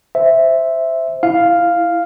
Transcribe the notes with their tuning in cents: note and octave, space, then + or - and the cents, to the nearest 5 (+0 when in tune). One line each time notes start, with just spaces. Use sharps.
C5 +0 E5 +0
E4 +0 F5 +0